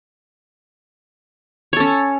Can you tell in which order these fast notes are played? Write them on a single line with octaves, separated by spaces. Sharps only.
C#5 A4 C#4